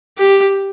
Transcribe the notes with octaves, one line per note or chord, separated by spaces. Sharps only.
G4